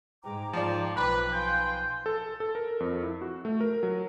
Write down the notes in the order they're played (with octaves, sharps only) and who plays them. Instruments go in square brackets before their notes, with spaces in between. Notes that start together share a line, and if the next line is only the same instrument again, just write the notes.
[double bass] G#2 G#3 [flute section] G5 A#5 D6
[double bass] G#2 [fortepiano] F3 D5
[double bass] B1 F3 [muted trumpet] B4 [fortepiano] B5
[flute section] F5 G#5 C6 [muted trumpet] G5
[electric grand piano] A4
A4
A#4
F2
E4
F#4
A3
A#4
F#3